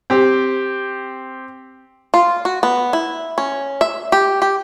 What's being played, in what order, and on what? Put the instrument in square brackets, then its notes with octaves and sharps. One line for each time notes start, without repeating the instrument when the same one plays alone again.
[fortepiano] C4 G4
[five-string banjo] F4
F#4
B3
E4
C#4
E5
G4
G4